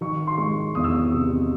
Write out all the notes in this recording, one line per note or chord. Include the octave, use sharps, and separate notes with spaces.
D#3 C#6
C6
G#3 C#6
E2 D#6
E6
D#6
C3